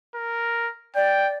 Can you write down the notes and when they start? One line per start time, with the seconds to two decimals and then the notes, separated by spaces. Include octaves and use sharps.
0.15 A#4
0.95 D5 G5